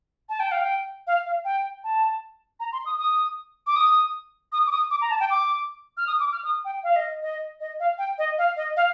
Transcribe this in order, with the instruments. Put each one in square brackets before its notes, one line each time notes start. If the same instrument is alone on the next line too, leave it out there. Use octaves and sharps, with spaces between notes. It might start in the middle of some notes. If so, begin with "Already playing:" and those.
[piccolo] A5
G5
F5
G5
F5
F5
G5
A5
A#5
C6
D#6
D#6
D6
D#6
D#6
D6
D#6
D6
A#5
A5
G5
D6
F6
D#6
D6
F6
D#6
G5
F5
D#5
D#5
D#5
F5
G5
D#5
F5
D#5
F5